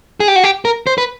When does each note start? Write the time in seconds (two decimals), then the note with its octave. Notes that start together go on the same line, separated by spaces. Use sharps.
0.20 G#4
0.28 G4
0.36 F#4
0.44 G4
0.65 A#4
0.87 C5
0.98 B4